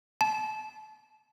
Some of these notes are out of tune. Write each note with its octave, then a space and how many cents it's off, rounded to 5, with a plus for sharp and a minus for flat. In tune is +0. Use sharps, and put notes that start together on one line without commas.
A5 -30